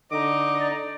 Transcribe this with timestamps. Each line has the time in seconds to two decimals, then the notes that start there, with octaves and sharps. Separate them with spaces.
0.12 D3 D#4 D#5 D6
0.61 D5